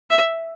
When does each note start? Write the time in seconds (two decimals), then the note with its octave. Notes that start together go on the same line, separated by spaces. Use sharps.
0.10 E5